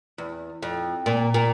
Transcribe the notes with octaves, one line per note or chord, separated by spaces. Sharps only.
E2
F2
A#2
A#2